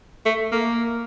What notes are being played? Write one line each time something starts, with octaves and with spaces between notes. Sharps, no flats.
A3
A#3